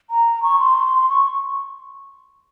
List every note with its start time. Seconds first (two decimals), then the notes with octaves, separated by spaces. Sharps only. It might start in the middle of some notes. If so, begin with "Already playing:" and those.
0.10 A#5
0.43 C#6
0.59 C6
1.09 C#6